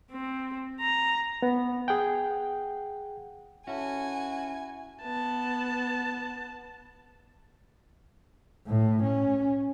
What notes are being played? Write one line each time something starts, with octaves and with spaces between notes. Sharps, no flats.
C4
A#5
B3
G#4 F#5 G5
C#4 E4 F#4 A4 G#5
B3 A5
A2
C#4